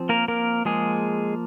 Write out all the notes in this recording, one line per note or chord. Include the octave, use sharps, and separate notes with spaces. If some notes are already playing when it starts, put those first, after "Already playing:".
Already playing: F3 C4
A#3 A#4
A#3 A#4
F3 G#3 A#3 G#4